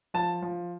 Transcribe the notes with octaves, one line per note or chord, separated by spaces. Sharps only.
F3 A5
F3